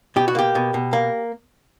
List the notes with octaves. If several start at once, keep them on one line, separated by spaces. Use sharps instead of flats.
B2 G4
F#4
A#3 G4
B2
B2
A#3